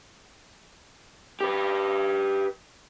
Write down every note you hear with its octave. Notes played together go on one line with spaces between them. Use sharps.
G4 B4